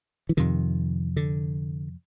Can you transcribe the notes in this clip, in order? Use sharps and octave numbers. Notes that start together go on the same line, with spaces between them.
E3
F2 C3 D#3
D3